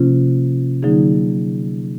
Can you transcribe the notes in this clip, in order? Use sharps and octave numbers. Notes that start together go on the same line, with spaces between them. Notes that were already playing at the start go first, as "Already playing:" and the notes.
Already playing: C3 F3 A#3 C#4 F4
D3 F#3 A#3 D#4 G#4